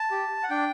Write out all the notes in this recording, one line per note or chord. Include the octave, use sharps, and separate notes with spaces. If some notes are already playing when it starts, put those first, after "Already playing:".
Already playing: A5
G4
F#5
D4 G5